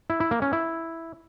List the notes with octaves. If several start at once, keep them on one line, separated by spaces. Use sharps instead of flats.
E4
E4
A#3
C#4
E4